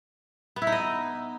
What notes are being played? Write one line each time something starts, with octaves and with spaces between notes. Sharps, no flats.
B3
E4
D#4
D#5